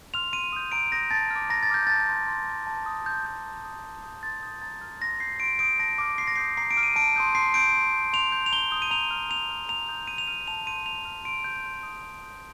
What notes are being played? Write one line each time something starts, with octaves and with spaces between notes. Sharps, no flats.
C6 F6 F7
C6 D#7
D#6 G6
A#5 D7
D#6 G6 A#6
A5 A6
F6
D6
A#5 A#6
A6
D6 F6 G6
A5 A6
C6 G6
C6
F6
A5
D#6 G6
C6 G6
D#6 G6
A#5
D#6 G6
A5
D#6 G6
C6 A6
D#6 G6
A#5 A6
F6
C6 A#6
G6 C7
C6 D7
D#6 G6 D7
A5 A#6
D6 F6
C6 C7
A#6
D#6 G6 C7
A#5 C7
D7
D6 F6
D#7
A5 D7
C6 D#6 G6
C6 C7
G6 D7
C6
G6
C6 F7
G6
F7
A#5 G7
D#6 G6
D#7
A#5 F7
F6
A#5 F7
F6
A#5 F7
D#6 G6
A#5 D#7
F7
F6 D#7
A5 F7
C6 G6 D#7
A#5 F7
F6
C6 D7
G6
C6
D#6 G6
C6
D#6 G6